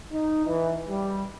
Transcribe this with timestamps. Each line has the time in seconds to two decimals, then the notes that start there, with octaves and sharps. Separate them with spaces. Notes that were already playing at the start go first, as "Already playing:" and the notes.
0.12 D#4
0.46 E3
0.88 G3